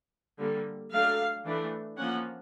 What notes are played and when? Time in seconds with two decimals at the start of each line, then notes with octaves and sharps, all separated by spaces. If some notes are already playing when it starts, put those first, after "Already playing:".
0.38 D3 G3 A#3
0.91 F#3 A3 D4 F5
1.45 E3 A3 D4
1.97 F3 A#3 C#4 F#5